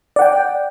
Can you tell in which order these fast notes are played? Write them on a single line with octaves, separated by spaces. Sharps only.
D5 F#5 G5